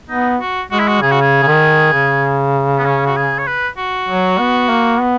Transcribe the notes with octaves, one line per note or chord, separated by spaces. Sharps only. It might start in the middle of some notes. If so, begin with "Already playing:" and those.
B3 D#4
F#4
G#3 F#4
E4
F#4
C#3 G#4
F#4
G#4
C#3
D#3
C#3
B3
C#4
F#4
G#4
C#5
B4
F#4
F#3
B3
A#3
B3